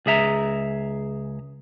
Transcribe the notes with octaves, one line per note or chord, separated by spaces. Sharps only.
C#2 G#4 E5 A#5